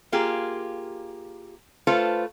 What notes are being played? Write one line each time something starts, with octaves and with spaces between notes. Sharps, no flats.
A#3 F4 G4 G#4
A3 F4 A4 B4 C5